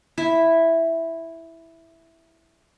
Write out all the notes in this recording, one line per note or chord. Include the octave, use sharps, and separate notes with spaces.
E4 E5